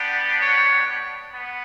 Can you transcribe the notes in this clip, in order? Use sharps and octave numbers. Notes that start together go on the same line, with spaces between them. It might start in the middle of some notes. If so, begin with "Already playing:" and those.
Already playing: B3 D4 G4
C#5
B3